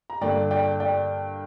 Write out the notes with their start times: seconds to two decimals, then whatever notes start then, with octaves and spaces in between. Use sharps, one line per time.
0.10 A#5
0.21 G2 D3 A#3 D5 G5
0.51 D5 G5
0.80 D5 G5